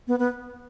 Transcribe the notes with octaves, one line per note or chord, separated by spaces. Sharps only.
B3
B3